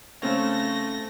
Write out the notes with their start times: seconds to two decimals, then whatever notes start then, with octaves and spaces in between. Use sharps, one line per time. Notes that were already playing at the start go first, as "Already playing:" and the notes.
0.22 C#3 A3 C4 C#4 A#6